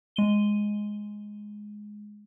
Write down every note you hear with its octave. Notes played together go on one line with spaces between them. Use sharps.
G#3 D#7 G7